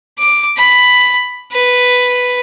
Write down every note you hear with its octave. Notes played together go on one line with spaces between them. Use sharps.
D6
B5
B4